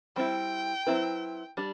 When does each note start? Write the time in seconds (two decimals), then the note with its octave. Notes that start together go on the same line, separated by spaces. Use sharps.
0.16 G3 C4 E4 G5
0.87 F#3 C4 E4 B4
1.57 G3 D4